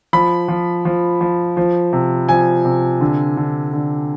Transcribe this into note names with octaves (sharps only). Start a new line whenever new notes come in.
F3 B5
F3
F3
F3
F3
C3
F3 G#5
C3
D3
D3
D3